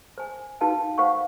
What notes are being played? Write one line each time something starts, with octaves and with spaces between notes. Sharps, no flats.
C5 G#5
D#4 F#4 B4 F5 G5 A5
C5 F5 F#5 C#6